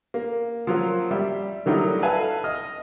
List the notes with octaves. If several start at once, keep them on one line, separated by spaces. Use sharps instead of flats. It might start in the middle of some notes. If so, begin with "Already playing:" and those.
A#3
F3 F#3 A#3
G3 E5
D#3 F#3 G3 A3 D#4 E4
A4 B4 E5 F5 G#5 A5
D#5 F6